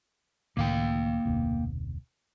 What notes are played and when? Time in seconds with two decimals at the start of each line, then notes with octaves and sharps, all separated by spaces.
0.57 C#2 A2 D#3 A#3 F5 G5
1.25 F1 D2 B2